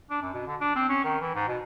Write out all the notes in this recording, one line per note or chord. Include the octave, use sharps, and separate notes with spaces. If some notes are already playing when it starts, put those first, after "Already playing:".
D4
F#2
B2
D3
D4
C4
C#4
D#3
E3
G#2
B2